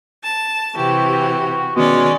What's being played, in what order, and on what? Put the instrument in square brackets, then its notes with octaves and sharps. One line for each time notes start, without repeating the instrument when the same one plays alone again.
[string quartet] A5
[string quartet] C3 E3 G4 [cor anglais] F#4
[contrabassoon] B2 [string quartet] D#3 C#4 D5 [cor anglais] G#3